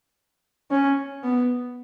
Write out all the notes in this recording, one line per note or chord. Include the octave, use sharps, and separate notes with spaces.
C#4
B3